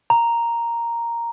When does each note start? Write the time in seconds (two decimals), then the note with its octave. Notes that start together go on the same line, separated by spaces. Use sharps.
0.10 A#5